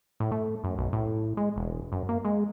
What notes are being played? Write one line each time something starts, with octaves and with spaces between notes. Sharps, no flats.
A2
A3
F#2
B1
A2
G#3
E1
F#2
A#3
G#3